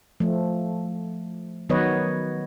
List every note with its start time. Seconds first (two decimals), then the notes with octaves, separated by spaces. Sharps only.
0.20 F3 A3
1.69 D#3 F#3 B3 B4 C#5 D#5